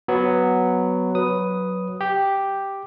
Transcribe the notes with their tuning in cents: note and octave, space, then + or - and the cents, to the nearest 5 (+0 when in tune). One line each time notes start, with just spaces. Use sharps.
F#3 +0 B3 +0
F#3 -5 B4 +0 D#6 +0
G4 +0 G5 +0